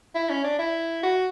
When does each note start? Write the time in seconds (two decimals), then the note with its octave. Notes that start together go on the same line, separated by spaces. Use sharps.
0.15 E4
0.30 C#4
0.44 D4
0.58 E4
1.03 F#4